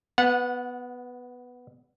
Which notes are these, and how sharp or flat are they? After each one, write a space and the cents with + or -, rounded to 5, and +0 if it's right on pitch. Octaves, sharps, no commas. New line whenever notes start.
B3 +0 F#5 -25